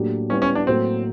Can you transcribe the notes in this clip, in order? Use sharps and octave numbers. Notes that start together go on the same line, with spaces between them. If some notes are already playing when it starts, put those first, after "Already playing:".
Already playing: A2 F#3 A#3 D4 G4
G3 B3 C#4 E4
C#4
D4
A2 F#3 A#3 C4